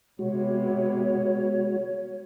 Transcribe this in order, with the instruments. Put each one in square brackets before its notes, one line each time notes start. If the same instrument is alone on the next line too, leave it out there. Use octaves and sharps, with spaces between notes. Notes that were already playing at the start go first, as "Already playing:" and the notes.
[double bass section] C3 B3 [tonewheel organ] G#3 F#4 [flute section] C#5